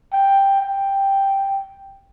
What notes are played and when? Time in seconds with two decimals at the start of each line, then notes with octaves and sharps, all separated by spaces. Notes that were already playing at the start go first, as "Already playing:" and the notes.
0.13 G5
0.61 G5